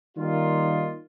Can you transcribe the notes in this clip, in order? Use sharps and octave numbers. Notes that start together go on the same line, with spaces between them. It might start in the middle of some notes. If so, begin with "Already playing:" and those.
D#3 G3 A#3 D#4 F4